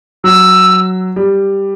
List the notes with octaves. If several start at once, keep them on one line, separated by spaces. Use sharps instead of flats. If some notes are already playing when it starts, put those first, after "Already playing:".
F#3 E6
G3